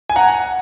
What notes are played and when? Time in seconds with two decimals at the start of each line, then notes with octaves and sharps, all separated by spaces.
0.10 G#5
0.16 F#5 A#5